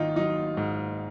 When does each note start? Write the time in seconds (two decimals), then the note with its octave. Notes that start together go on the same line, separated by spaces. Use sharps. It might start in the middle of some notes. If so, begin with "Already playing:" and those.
Already playing: G#1 D#3 D#4 F4
0.16 F#3 D#4
0.57 G#2